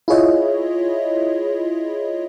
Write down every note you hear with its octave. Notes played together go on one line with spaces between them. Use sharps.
E4 F4 G#4 C#5 D#5 E5